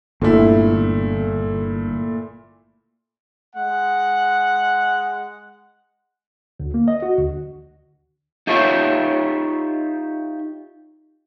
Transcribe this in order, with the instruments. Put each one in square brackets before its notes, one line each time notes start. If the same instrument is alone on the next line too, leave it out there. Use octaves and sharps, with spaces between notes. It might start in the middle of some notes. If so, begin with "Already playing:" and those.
[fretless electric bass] G1 [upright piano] A#2 A3 E4
[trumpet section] G#3 F#5
[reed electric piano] D2
A#3
D#5
F#4
D2
[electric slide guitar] D#4 F4 G4 C#5 E5